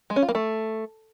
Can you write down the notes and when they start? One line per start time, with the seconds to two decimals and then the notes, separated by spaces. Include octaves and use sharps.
0.10 G#3
0.16 C#4
0.22 F4
0.29 A#3
0.35 A3